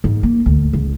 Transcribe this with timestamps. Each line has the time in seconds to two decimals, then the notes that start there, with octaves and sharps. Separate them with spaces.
0.04 G#2
0.23 A#3
0.46 D2
0.73 C#2